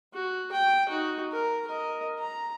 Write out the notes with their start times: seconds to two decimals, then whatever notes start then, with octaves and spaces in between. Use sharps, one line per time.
0.13 F#4
0.52 G5
0.88 D#4 F#4
1.32 A#4
1.67 A#4 D#5
2.19 A#5